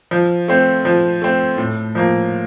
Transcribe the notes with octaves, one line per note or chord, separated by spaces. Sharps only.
F3
A3 C4
F3
A3 C4
A2
F3 A#3